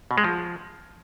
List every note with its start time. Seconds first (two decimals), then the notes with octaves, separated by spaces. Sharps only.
0.11 B2
0.18 G#3
0.24 F3